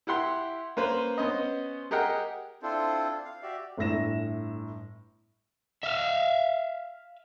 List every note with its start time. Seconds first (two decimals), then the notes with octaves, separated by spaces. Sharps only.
0.07 E4 G4 F#5 C6
0.77 A#3 C#4 B4 C5
1.18 B3 C#4 C5 D#5
1.91 G4 G#4 A#4 D#5 F#5 G5
2.63 C4 D4 E4 F4 A4 C5
3.25 F5
3.42 F#4 G4 D5 E5
3.77 G1 A2 A#6 E7
5.83 E5 F5